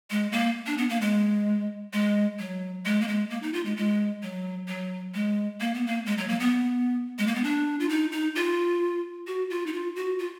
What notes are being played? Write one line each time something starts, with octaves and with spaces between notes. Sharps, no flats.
G#3
A#3
D4
B3
A#3
G#3
G#3
F#3
G#3
A#3
G#3
A#3
D#4
F4
G#3
G#3
F#3
F#3
G#3
A#3
B3
A#3
G#3
F#3
A#3
B3
G#3
A#3
B3
D4
F4
D#4
D#4
F4
F#4
F4
D#4
F4
F#4
F4